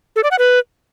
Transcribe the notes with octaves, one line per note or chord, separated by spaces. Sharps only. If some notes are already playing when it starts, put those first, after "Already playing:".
A4
D5
F#5
B4